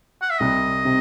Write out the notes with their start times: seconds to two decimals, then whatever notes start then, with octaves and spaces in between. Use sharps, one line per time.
0.22 F#5
0.30 E5
0.40 C2 D#5
0.85 C3